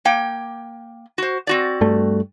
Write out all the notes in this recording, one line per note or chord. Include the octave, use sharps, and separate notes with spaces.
A#3 G5
F#4 C5
C4 F#4 D5
G2 G3 A3